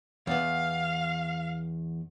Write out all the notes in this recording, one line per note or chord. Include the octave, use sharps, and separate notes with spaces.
E2 B3 F5